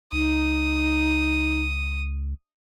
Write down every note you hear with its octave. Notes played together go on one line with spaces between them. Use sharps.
C#2 D#4 D#6